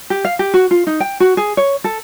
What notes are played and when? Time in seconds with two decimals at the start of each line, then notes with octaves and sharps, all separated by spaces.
0.10 G4
0.25 F5
0.39 G4
0.54 F#4
0.71 F4
0.87 D#4
1.00 G5
1.20 F#4
1.37 G#4
1.57 C#5
1.84 A4